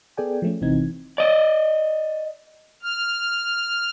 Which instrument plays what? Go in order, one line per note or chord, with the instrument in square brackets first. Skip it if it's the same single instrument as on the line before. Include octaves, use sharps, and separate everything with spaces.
[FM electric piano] B3 G#4 A4 D5 G5 G#5
F3 A3 C#4
G1 C3 E3 C4 D#4 G#6
[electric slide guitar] D5 D#5
[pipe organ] F6